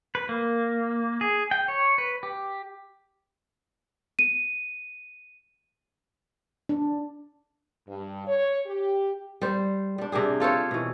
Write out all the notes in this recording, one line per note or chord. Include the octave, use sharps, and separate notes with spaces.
B4
A#3
G#4
G5
C#5
B4
G4
D#7
D4
G2
C#5
G4
G3 C5
G3 D4
C3 D4 G4 G#4
F4 A4 C5 C#5
B2 E3